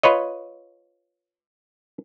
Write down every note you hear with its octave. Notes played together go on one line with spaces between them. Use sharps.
F4 B4 C#5 D#5